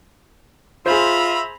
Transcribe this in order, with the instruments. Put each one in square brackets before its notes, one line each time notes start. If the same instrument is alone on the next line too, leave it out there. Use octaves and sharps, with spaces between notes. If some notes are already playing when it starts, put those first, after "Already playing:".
[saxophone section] F4 [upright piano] G#4 C5 [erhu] E5 [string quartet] A#5 B5